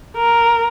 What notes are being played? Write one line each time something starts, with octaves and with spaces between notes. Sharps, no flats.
A#4